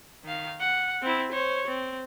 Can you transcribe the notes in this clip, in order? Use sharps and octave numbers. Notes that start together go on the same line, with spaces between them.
D#3 F5
F#5
C4 E4
C5 C#5
C4